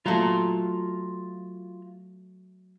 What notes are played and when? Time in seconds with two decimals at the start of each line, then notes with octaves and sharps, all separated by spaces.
0.06 F#3 A3 F4 A#5